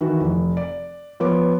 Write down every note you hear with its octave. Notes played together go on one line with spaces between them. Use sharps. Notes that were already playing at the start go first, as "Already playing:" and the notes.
D#3 E3 F#4
F1
D5
F3 B3 C#5 D6